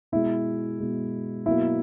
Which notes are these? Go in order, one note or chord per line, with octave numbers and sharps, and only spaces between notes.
B2 G#3 E4
B2 G#3
B2 F#3 A#3 E4